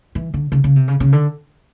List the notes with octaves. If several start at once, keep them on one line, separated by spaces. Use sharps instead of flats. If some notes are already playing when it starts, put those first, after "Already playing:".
E3
D3
C#3
C#3
C3
C#3
C#3
D3